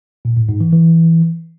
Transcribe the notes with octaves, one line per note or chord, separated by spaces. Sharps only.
A#2
A2
G#2
E3
E3